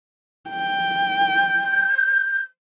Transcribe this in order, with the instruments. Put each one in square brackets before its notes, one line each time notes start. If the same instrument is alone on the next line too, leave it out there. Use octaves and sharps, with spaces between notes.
[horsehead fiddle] G5
[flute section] G6